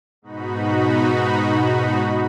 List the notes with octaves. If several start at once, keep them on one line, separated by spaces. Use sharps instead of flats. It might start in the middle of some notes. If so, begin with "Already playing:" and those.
G#2 B2 D#4 F#4 B5